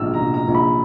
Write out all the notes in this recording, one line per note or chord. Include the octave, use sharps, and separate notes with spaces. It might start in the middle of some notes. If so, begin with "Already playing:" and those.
Already playing: A#1 G#2 E3 E6 F6
A#5
A#1
A#5
A#1
B5